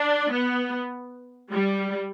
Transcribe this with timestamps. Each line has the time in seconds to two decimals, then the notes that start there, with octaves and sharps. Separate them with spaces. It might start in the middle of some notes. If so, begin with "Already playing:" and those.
Already playing: D4
0.32 B3
1.52 G3